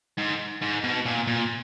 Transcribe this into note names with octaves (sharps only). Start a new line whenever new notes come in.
G#2
G#2
B2
A#2
A#2